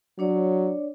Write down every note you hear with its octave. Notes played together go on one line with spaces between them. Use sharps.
F#3 D4 C#5 D5